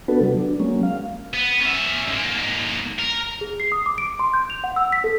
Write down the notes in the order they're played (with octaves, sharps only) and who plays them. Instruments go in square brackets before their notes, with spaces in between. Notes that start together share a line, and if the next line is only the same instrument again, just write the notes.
[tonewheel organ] B3 D4 F#4 A4 B4
C3 F#3 G3
D4
F#3 G#3 A#3 C#4
F5
[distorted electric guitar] B3
C#4 E5
G#2 A#3
A#4
[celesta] G#4
C7
D#6
D6
D7
C6
G6
F7
F#5
E6
B6
A4